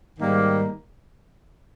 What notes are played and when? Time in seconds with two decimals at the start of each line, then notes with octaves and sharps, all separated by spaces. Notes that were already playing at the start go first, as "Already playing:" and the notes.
0.17 G#2 D#3 G3 A#3